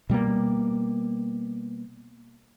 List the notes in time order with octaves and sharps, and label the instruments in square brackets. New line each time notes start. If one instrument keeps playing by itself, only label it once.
[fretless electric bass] B2 G3 G#3 A#3